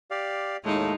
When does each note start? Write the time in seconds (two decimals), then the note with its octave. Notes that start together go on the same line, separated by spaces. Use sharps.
0.11 G4 D5 F5
0.64 D#2 A2 G#3 A3 D#4